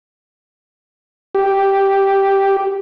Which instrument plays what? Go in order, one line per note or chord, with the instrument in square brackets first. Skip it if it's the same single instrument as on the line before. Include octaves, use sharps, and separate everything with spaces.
[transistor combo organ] G4